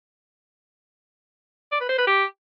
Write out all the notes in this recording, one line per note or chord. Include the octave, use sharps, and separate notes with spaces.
D5
B4
C5
B4
G4